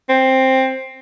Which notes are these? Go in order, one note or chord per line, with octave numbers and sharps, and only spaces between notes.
C4